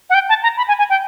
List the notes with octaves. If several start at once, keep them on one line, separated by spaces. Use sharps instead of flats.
F#5
G5
A5
A#5
B5
G#5
G#5
G5